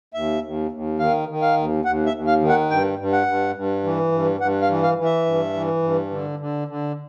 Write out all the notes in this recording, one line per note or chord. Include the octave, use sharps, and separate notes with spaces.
D#2 E5
D#2
D#2
D#3 F5
D#3
F5
D#2
D#2 F#5
E5
D#2
F5
D#3
F#5
G2 G5
G2
F#5
G2
G2
E3
G2
G2 F#5
F5
E3
F5
E3
E5
G2
E3
G2
D3
D3
D3